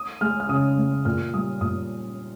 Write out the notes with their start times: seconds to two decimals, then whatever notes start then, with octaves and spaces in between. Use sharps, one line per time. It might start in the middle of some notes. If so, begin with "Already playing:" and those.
Already playing: D#6
0.21 G#3 F6
0.40 F6
0.49 C#3 D#6
0.78 G#3
1.05 A#2 F6
1.34 G3 D#6
1.61 A#2 D#6